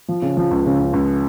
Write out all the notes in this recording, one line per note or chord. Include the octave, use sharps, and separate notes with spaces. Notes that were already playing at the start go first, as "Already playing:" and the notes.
F3
C#3
F3
C#2
C#3
C#2
C#2